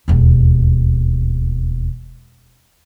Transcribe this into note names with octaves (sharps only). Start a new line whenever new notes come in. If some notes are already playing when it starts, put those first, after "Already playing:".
E1 D#2